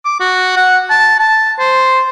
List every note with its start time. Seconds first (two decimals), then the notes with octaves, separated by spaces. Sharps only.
0.05 D6
0.20 F#4
0.57 F#5
0.90 A5
1.20 A5
1.59 C5